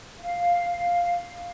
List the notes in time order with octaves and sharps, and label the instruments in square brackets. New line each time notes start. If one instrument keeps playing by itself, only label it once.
[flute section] F5